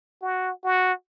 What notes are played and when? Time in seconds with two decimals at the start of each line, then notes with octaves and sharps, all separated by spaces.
0.22 F#4
0.64 F#4